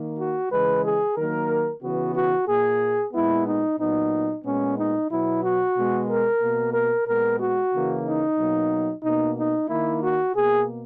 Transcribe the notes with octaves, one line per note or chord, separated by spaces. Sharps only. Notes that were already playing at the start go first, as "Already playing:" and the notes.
Already playing: D#3 A#3
F#4
C#3 E3 G#3 B4
G#4
D#3 F#3 A#3 A#4
C#3 E3 B3 F#4
F#4
A#2 A#3 G#4
A#2 G#3 B3 E4
D#4
A#2 F#3 B3 D#4
A#2 G#3 B3 C#4
D#4
B2 F#3 B3 E4
F#4
B2 G#3 B3
A#4
B2 A#3
A#4
A#2 G#3 B3 A#4
F#4
C#3 E3 A#3
D#4
B2 F#3 A#3
B2 A#3 D#4
D#4
D#3 A#3 E4
F#4
B2 A#3 G#4